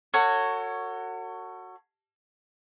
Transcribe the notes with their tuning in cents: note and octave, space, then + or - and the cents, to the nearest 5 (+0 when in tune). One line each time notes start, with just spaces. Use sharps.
F#4 +0 A4 +40 C#5 +0